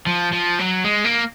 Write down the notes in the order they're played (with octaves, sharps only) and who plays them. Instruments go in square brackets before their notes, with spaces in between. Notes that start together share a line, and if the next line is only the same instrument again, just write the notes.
[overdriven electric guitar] F3
F3
F#3
G#3
A#3